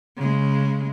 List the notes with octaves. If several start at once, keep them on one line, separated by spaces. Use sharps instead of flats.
C#3 G#3